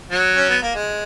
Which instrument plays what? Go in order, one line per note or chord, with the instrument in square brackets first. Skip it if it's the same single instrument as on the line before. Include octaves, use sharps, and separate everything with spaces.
[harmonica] F#3
C#4
B3
A#3
G#3